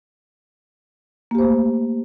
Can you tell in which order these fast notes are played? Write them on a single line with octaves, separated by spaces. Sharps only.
A#3 G4 C5 A3